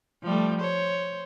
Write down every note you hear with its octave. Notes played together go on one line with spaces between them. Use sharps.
F3 G3 A3
C5 C#5